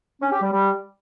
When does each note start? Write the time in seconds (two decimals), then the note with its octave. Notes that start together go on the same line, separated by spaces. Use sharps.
0.22 C#4
0.32 G4
0.42 G3
0.52 G3